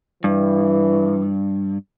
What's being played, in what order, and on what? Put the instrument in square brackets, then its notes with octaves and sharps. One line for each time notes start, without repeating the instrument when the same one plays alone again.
[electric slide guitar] G2 [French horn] E3